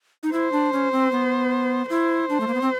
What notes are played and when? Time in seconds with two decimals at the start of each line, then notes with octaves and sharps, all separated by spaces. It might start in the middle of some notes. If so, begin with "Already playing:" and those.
0.23 D#4
0.33 E4 C5
0.52 D4
0.73 C#4
0.92 C4
1.12 B3
1.90 E4 C5
2.29 D4
2.40 A3
2.47 A#3
2.54 B3
2.61 C4